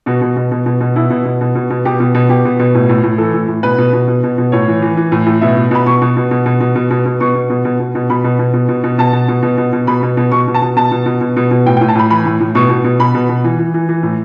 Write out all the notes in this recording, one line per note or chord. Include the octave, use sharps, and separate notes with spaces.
B2 F#4
B2
B2
B2
B2
B2
B2 E4
B2
B2
B2
B2
B2
B2 G4
B2
B2
B2 G4
B2
B2
A2
A2
A2
E3 A4
A2
A2
B2 B4
B2
B2
B2
B2
B2
A2 C#5
E3
E3
E3
A2
A2
B2 E5
B2
B2 B5
B2 C#6
B2
B2
B2
B2
B2
B2
B2
B2
B2 C#6
B2
B2
B2
B2
B2
B2 B5
B2
B2
B2
B2
B2
B2 A5
B2
B2
B2
B2
B2
B2 B5
B2
B2
B2 C#6
B2
A5
B2
B2 A5
B2
B2
B2
B2
B2
A2 G5
G5
A2
A5
A2 B5
E3 B5
A2
A2
B2 C#6
B2
B2
B2 B5
B2
B2
E3
E3
E3
E3
A2